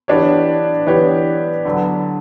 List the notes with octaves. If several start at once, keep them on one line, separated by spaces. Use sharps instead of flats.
E3 B3 D4 G4 C#5
E3 B3 D4 G4 C#5
D3 F#3 B3